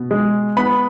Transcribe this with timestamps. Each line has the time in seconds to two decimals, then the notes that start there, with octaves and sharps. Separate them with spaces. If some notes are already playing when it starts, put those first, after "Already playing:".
Already playing: B2
0.11 G#3
0.57 B3 B5